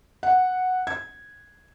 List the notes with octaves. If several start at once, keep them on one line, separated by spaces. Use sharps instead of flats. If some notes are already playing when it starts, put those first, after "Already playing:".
F#5
G#6